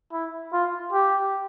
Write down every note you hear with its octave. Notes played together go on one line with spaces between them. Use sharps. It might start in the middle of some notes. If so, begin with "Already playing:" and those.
E4
F4
G4